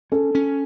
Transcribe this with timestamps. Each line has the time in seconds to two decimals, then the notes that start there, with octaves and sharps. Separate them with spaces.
0.12 C#4 A4
0.35 C#4